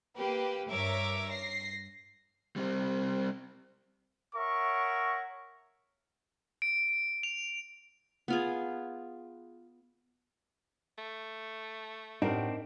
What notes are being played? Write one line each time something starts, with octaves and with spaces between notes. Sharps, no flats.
A#3 G4 B4
G2 A#4 C#5 E5 D6
A#6 C7
G3 C4
A#4 C#5 E5 F#5 C#6
D7
F7
B3 F4 G#4
A3
A2 C4 D4 D#4 G4 A#4 F#5